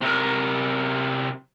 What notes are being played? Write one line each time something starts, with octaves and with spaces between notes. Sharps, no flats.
C3 A#4